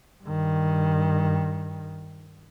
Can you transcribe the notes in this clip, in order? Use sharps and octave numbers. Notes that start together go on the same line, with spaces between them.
G2 D#3